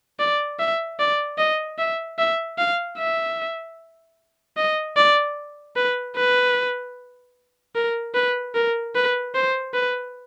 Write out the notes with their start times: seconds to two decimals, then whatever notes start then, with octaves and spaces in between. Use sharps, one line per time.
0.19 D5
0.59 E5
0.99 D5
1.38 D#5
1.79 E5
2.19 E5
2.58 F5
2.98 E5
4.57 D#5
4.97 D5
5.76 B4
6.16 B4
7.75 A#4
8.15 B4
8.55 A#4
8.95 B4
9.35 C5
9.74 B4